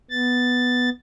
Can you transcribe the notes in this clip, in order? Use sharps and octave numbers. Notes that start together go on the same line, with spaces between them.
B3 A6